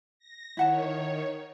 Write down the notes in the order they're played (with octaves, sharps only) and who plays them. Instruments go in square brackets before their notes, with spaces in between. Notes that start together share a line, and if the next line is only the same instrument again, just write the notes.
[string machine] A#6
[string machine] D#3 C#5 [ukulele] E4 F#5 A5